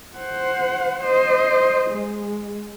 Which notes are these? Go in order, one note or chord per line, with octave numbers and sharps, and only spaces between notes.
C5 F#5
C5 D#5
G#3